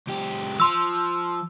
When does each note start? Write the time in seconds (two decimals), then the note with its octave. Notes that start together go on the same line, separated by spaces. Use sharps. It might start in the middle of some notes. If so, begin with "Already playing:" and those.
0.07 C#2 G4
0.60 F3 C6 E6